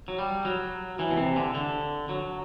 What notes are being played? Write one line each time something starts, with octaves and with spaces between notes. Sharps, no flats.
F#3
G3
F#3
E3
B2
C3
D3
D3
F#3